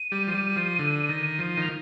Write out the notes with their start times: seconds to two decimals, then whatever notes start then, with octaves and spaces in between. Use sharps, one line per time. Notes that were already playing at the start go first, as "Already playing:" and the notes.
Already playing: D#7
0.12 G3
0.27 F3
0.34 G3
0.56 F3
0.79 D3
1.09 D#3
1.39 F3
1.57 D#3 F7